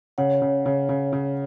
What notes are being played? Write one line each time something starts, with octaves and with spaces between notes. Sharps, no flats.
C#3 C#5 F#5
C#3
C#3
C#3
C#3